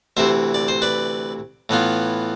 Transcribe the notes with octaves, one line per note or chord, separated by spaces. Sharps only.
D2 C3 E3 C5 E5
D5
C5
B4 D5
A2 E3 B3 F4